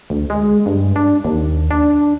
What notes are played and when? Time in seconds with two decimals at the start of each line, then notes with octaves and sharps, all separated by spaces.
0.10 D2
0.30 G#3
0.66 G2
0.96 D4
1.25 D#2
1.71 D4